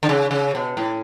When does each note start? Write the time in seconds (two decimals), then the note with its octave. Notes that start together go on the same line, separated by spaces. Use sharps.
0.03 D3
0.09 C#3
0.31 C#3
0.55 B2
0.77 A2